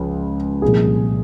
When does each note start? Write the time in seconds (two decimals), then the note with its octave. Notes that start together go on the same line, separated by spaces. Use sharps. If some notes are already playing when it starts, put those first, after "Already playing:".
Already playing: C#2 C#3 F3
0.62 C2 A#2 F3 G#4